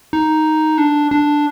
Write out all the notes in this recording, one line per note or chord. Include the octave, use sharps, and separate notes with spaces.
D#4
D4
D4